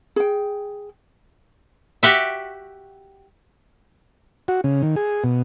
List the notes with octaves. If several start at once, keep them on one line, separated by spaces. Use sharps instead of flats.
G#4 G5
F#4 G4 E5
F#4
C#3
D#3
G#4
B2